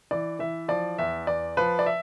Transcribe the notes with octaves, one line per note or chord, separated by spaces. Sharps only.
E3 D5
E3 E5
F3 D5
E2 E5
E2 D5
F3 B4
D5
E5